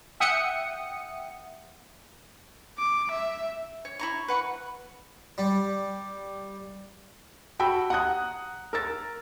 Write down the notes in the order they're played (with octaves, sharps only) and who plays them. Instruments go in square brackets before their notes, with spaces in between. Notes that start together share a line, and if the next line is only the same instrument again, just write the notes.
[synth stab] E5 F#5 G5 D#6 C#7
[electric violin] D6
E5
[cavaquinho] C#5
E4 A#5 C#6
B4 F#5 C#6
[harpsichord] G3
[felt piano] F#4 G5 A5 B5 E6
F#5 A#5 D#6 F#6
A#4 E6 A6